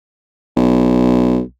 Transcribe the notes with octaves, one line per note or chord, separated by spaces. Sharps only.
B1